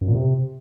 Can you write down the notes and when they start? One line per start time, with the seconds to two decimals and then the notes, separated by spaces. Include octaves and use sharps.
0.01 F#2
0.08 A#2
0.15 C3